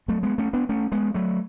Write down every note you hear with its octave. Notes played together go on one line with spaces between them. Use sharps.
F#3 A3
G#3 B3
A3 C#4
B3 D4
A3 C#4
G#3 B3
F#3 A3